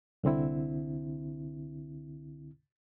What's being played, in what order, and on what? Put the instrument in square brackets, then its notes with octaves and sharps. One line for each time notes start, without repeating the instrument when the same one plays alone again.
[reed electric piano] C2 D3 C4 E4